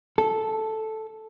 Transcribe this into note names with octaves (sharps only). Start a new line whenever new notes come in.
A4